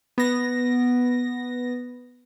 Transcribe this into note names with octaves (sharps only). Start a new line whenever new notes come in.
B3 A#6